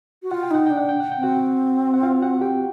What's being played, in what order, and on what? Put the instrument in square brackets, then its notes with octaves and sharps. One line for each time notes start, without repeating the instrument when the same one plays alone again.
[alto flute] F#4
[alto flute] F4 [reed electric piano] F#5
[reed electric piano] G5
[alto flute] D#4 [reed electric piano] F#5
[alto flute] D4 [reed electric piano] G5
[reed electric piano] F#5
G5
F#5
G5
[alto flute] C4
[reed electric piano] F#4 F#5
F#5
F4 F5
F#4 F#5
G4 G5